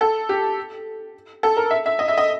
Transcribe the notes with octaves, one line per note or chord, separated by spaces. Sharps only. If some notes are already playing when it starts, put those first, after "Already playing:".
A4
G4
A4
A#4
E5
E5
D#5
E5
D#5